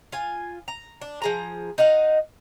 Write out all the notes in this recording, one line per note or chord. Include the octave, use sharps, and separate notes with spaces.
F4 G#5
A#5
D4
F3 G#4 A#5
D#4 D#5 F5 F#5